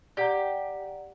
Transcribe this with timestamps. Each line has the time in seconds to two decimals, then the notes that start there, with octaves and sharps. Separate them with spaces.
0.17 G4 D5 F#5 A#5